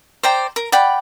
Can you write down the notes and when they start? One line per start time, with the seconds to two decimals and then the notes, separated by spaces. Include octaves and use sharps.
0.23 C5 D5 G5 A#5
0.56 A#4
0.72 D5 F#5 G5 B5